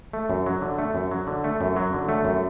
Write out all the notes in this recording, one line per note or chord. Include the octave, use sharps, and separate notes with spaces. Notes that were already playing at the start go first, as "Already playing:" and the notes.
A3
F#2
F#3
D3
A3
F#2
F#3
D3
A3
F#2
F#3
D3
A3
F#2